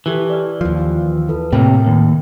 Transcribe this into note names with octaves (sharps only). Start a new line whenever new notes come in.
E3 E4 G4 A4
D5 F6
D#2 F3
E4 A4 B4
A2 C3 A#3 G5
D#2